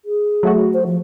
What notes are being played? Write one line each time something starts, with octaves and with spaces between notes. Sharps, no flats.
G#4
F#3 A3 F#4
C5
F3